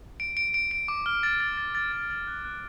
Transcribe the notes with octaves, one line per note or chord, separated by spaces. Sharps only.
D7
D7
D7
D7
D6
F6
A6
A6
A6
A6
A6
A6
F#6
F#6